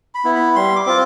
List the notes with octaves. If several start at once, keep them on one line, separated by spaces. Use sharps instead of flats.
B5
B3 E4
B5
G3 C6
D6
C4 F4